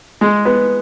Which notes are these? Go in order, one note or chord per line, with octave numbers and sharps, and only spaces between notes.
G#3
B3